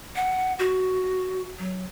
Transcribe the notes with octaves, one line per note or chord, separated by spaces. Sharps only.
F#5
F#4
F#3